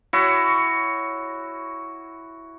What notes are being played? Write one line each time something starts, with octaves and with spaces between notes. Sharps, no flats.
E4 F#4 C#5